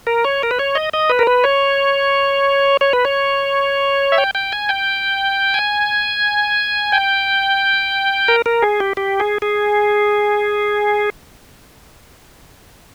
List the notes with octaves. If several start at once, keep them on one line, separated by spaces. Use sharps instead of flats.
A#4
C#5
A#4
B4
C#5
D#5
D#5
B4
A#4
B4
C#5
C#5
B4
C#5
E5
G5
G5
G#5
G5
G#5
G5
A#4
A#4
G#4
G4
G4
G#4
G#4